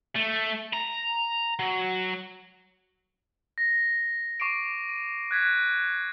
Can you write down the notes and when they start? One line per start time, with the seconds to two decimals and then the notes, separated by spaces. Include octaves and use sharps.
0.16 A3
0.73 A#5
1.60 F#3
3.58 A#6
4.40 C#6 D6 C7 D7
4.89 D#7
5.31 F#6 G#6 B6